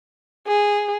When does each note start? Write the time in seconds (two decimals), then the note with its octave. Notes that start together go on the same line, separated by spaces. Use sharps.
0.47 G#4